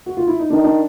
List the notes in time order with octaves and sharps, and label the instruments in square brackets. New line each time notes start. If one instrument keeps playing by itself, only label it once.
[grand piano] F#4
F4
E4
D#4
[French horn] D#3 [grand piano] D4
[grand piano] D4